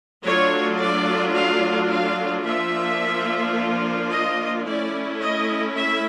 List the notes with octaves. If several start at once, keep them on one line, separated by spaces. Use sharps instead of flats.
F#3 A3 D4 F4 C#5
D5
F5
F5
F3 A#3 D4 F4 E5
D#5
A3 C#4 E4 D5
D#5
E5